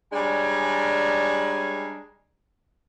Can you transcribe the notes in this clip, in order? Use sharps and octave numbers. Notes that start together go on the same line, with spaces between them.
G3 G#3 C#4 D4 G#5 A#5